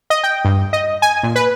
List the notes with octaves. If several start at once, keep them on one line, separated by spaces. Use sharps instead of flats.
D#5
G5
G2
D#5
G#5
A#2
B4